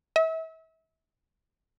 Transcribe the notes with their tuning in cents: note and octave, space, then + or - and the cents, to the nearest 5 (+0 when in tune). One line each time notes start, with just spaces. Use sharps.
E5 -35